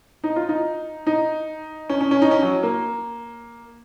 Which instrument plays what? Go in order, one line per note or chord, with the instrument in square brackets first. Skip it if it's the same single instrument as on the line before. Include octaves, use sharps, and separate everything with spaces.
[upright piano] D#4
F4
D#4
D#4
C#4
C#4
C#4
D#4
C#4
F#3
A#3